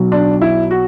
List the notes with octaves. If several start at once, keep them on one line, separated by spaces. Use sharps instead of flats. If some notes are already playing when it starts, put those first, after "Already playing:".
Already playing: B1 B2 F#3
D4
E4
F#4